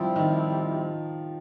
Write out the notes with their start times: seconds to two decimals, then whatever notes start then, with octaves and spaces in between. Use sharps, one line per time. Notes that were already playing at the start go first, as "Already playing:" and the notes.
Already playing: F3 G3 C4 E4 F4
0.16 D#3 D#4